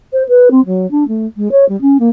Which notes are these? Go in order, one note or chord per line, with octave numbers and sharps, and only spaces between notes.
C5
B4
C4
F#3
D4
A3
G#3
C#5
G3
C#4
A#3